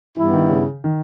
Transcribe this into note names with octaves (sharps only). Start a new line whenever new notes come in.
G2 E3 G3 B3 E4
D#3
C#3
D#3